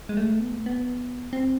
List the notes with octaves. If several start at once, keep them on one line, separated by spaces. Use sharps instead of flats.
G#3
A3
B3
A3
B3
C4